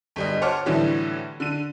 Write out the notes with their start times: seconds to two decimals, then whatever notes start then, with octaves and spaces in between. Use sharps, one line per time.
0.16 G1 G3 D#5
0.42 C5 C#5 F#5 A5 D6 F6
0.66 A2 D3 E3 F#3 G3
1.40 D3 D#7